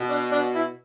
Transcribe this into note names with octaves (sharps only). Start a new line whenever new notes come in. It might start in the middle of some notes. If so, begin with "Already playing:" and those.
Already playing: B2
D4
D4
E4